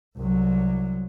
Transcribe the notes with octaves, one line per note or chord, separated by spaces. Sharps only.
C2 F#3